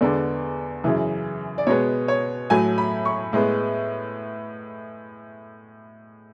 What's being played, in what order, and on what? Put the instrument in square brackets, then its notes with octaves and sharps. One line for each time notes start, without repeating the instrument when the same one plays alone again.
[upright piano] E2 D3 G#3 B3 D5
F#2 C#3 E3
D5
B2 G#3 B3 C#5
C#5
A2 F#3 A3 G#5
B5
C#6
A2 G#3 B3